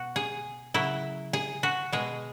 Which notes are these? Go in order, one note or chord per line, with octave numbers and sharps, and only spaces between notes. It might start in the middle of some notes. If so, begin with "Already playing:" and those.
Already playing: B2 F#4
G#4
C#3 F#3 E4
G#4
F#4
B2 G#3 G#4